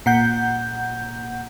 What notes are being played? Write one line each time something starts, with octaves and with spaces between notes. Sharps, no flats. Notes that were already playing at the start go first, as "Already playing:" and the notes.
A#2 F#5 G6